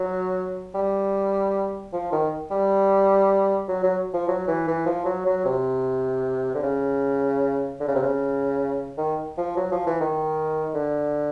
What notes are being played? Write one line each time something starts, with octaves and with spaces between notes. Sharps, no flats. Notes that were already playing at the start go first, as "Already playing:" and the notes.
Already playing: F#3
G3
F3
D#3
G3
F#3
F#3
F3
F#3
E3
E3
F3
F#3
F#3
C3
D3
C#3
D3
C#3
C3
C#3
D#3
F3
F#3
F3
E3
D#3
D3